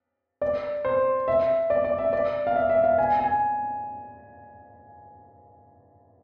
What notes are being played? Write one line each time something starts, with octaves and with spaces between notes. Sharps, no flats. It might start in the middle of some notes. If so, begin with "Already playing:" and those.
D5
C5
E5
D5
D5
E5
D5
F5
E5
E5
F5
G#5
G#5